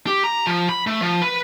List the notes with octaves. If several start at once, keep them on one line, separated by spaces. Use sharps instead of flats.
G4
A#5
F3
B5
A3
F3
B4